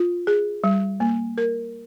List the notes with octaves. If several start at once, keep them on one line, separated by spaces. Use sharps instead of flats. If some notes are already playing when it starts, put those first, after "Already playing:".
Already playing: F4
G#4
G3
A#3
A#4